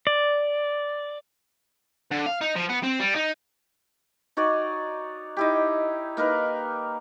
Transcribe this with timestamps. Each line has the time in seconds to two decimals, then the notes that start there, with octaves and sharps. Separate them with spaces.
0.07 D5
2.12 D3
2.26 F5
2.41 D#4
2.55 F3
2.69 B3
2.83 C4
2.99 G3
3.15 D#4
4.37 D#4 F#4 C#5 D5
5.37 D#4 E4 G4
6.17 A#3 D#4 A#4 B4